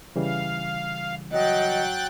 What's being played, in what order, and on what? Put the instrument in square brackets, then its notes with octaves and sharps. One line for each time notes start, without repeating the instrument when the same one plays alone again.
[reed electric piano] C#3 E3 G3 [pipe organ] F5
[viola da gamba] F#3 [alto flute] D#5 [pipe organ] G5 F#6 A6